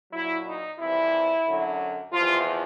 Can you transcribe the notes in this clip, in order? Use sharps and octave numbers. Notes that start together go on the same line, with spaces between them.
A#2 F#3 E4
D#4
F2 C3 E3 G3 E4
F#2 D3 F#3
E2 C3 F3 F4